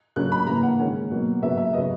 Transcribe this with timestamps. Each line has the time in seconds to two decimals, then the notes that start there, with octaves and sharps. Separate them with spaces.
0.16 C#3 F#3 C#4 F#6
0.32 B5
0.47 C#3 E3 A#3 A#5
0.63 F#5
0.79 D#3 G#3 C#4
1.11 B2 F#3 A#3
1.41 C#3 F#3 B3 E5
1.57 E5
1.73 C#3 F#3 B3 D#5